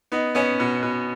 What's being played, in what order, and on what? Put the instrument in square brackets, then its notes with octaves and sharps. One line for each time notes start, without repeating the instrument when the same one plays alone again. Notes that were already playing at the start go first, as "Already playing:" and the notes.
[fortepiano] B3 D#4
B3 C#4
B2
B2